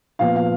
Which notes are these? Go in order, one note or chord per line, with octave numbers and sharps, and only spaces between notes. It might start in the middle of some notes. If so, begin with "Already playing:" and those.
A#2 F3 B3 F5
F5